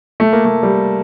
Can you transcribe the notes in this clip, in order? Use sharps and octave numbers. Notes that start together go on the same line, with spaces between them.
A3
A#3
A3
G3